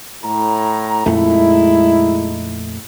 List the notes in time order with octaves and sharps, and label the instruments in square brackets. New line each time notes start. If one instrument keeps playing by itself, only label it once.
[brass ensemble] A2 A#5
[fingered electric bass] F2 A#2 A3 [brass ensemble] G#3 D#4 E4